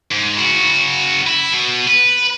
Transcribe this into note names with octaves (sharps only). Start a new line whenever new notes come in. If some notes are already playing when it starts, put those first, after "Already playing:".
G#2
C#3 F#4
E4
B2
B4